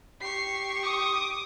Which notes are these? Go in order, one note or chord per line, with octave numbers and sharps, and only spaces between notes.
G4 C#6 C7
D6 D#6